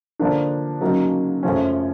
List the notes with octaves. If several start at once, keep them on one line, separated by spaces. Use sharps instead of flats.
D3 F3 A#3 D4
C#3 F#3 A#3 D#4
F#2 C#3 F3 A3 C#4